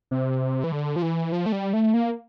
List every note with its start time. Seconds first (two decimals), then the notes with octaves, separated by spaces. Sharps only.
0.11 C3
0.64 E3
0.72 D3
0.96 F3
1.02 E3
1.32 F3
1.46 A3
1.52 G3
1.73 A3
1.94 A#3